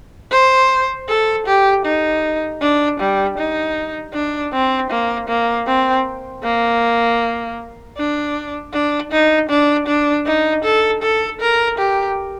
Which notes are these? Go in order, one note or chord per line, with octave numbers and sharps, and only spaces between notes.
C5
A4
G4
D#4
D4
G3
D#4
D4
C4
A#3
A#3
C4
A#3
D4
D4
D#4
D4
D4
D#4
A4
A4
A#4
G4